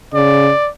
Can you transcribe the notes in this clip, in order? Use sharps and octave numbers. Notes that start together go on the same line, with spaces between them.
C#3 D5